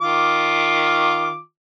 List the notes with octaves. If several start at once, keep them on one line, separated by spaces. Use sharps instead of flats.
D#3 F4 D6